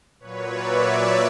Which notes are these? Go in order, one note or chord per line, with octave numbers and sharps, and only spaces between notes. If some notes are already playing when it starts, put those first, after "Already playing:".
A#2 F#3 B4 C#5
D5 E5